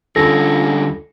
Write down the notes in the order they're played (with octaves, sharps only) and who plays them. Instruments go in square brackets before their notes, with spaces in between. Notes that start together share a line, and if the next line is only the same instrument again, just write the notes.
[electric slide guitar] D3 G3 C#4 [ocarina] F4 [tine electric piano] A4 A#6